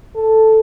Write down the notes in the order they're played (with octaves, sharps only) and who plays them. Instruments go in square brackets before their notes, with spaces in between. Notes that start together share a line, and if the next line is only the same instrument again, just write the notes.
[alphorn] A4